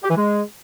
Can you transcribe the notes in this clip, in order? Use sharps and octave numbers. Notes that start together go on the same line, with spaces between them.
G4
E3
G#3